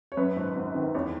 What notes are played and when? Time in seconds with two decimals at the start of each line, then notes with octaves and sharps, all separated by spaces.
0.12 C#5
0.17 F#2 B4
0.37 G#1
0.55 G#1
0.75 D#3
0.94 E2 C#5